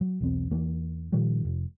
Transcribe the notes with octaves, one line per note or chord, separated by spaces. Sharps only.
F#3
B1 E2 C4
E2 E3 A#3
A#2 D#3 F3 G3
F1